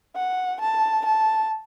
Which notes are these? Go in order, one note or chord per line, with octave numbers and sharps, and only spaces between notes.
F#5
A5
A5